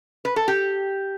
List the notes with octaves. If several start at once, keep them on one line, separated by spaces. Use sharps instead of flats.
B4
A4
G4